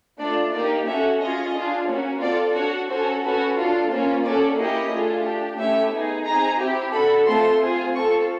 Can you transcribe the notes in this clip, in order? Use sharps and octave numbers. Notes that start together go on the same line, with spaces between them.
A3 D4 F4 D5
A#3 D#4 G4 D5
C#4 F#4 A4 E5
C#4 F4 G#4 D#5
D4 F4 G#4
A#3 C#4 F#4
C4 F4 A4 D5
D4 F#4 A4 C#5
C#4 F#4 A4 C5
C#4 F#4 A4 B4
D4 F4 A4
A#3 C#4 F4 C5
C#4 F#4 A4 D5
A#3 C#4 E4 G4 D#5
A3 D4 F4 G#4
D4 G4
A3 C#4 E4 G4 E5
B3 D#4 G#4
C4 D#4 G#4 A#5
C4 E4 G4
D4 F#4 A4 B5
A3 C4 F4 A4 C6
C4 F4 G#4
C4 F4 A4 C#6